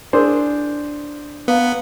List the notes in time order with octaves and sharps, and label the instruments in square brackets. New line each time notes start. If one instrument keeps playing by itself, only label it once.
[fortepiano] D4 G#4 C5 [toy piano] E4 A#4 C6
[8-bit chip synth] B3 [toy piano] B4 F5 A#5